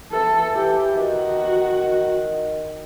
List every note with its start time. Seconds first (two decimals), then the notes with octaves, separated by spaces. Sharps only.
0.12 E3 A4
0.54 E3 G4
0.97 D#3 F#4